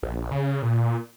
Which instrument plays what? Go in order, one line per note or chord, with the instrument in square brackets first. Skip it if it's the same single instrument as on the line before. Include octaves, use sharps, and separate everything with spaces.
[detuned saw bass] A#1
C#3
A#2